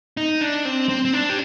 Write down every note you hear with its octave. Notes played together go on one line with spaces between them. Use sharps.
D#4
D4
C4
C4
C4
D4
G4